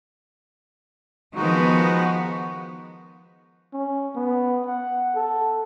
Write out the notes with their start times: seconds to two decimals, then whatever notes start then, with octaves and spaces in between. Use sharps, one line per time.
1.35 D#3 F3 G#3 B3 D#4 F#4
3.73 C#4
4.15 B3
4.66 F#5
5.16 A4